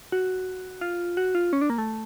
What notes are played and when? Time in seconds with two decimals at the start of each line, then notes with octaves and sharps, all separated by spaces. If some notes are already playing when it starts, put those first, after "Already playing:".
0.12 F#4
0.81 F4
1.17 F#4
1.35 F4
1.53 C#4
1.61 D4
1.70 A#3
1.78 A3